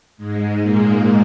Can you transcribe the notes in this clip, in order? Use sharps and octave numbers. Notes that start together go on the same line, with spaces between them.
G#2 G#3
A#2 A#3